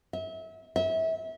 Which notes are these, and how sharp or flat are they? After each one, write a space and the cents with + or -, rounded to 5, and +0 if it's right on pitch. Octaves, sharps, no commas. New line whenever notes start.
E5 -30
E5 -30